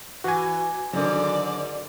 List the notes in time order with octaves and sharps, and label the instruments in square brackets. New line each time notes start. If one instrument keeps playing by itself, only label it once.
[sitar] E3 [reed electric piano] F#4 G#5
[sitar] G#2 [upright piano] D3 D#3 F#3 [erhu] D5